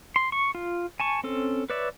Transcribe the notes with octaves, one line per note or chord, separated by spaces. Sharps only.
C6
C#6
F4
G#5 A5 C#6
C4 C#4 A4
B4 C#5 D5 E5